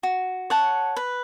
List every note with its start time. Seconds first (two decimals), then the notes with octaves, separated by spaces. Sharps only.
0.03 F#4
0.50 C#5 F#5 A5
0.97 B4